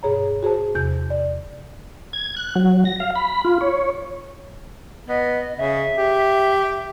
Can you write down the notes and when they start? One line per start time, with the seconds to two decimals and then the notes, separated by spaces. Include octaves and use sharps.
0.03 G2 B2 G#4 C#5 A#5
0.43 F#4 G#4 C5 A5
0.75 E2 C3 F#4 G6
1.10 D5
2.13 G#6
2.36 F#6
2.56 F#3
2.85 A#6
3.00 F5
3.16 B5
3.45 F4
3.61 C#5
5.08 B3 D#5
5.57 C#3 E5
5.98 G4